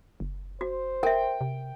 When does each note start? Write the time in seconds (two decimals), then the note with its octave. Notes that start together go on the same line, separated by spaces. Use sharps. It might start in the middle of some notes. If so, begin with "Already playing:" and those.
0.20 F#1
0.61 F#4 C5
1.03 A#4 E5 G5
1.41 C3